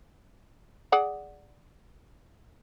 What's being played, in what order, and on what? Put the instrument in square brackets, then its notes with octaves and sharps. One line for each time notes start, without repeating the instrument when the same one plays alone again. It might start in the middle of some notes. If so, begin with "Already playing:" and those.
[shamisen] G#4 D5 F#5